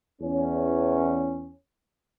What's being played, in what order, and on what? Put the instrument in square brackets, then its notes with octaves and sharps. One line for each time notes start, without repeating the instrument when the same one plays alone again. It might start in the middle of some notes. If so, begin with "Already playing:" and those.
[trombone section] E2 C#4